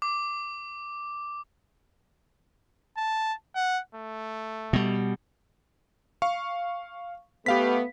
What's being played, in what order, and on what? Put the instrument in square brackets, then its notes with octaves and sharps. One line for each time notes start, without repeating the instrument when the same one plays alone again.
[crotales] D6
[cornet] A5
F#5
A3
[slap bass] B2 G3
[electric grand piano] F5 C#6
[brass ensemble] A3 B3 [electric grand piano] G4 F5 B6